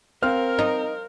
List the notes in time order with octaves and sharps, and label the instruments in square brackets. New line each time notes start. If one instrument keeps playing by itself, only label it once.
[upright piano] C4 [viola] A#4 [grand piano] C5 F5 F6
[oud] D#4